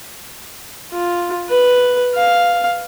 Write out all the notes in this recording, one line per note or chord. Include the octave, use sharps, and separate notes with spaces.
F4
B4
F5